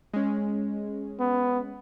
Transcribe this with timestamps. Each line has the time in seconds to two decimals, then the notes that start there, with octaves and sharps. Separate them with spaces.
0.13 G#3 C#4
1.20 B3